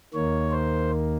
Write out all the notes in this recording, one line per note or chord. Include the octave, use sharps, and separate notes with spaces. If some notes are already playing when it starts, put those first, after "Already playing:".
D#2 D#3 A#3 C#5
C5